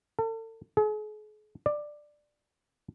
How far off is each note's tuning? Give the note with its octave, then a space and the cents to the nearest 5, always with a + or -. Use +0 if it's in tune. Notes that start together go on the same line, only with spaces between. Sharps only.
A4 +35
G#4 +40
D5 +10